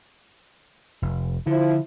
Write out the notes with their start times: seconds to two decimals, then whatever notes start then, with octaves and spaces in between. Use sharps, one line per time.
1.02 F1
1.46 D3 F3 E4